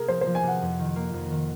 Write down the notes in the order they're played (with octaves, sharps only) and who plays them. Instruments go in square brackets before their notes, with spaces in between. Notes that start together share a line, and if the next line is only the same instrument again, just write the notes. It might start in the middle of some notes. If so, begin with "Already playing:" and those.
Already playing: [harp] C3 A#3 [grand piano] G#4 A#4
[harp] F3 [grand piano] C5
[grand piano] C5
[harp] F3
[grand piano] G#5
[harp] C3 [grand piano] F#5
[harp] F2
D#3
A#3
F2
D#3